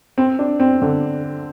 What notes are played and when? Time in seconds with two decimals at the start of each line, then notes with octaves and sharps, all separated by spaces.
0.18 C4
0.39 D4
0.60 C4
0.82 D3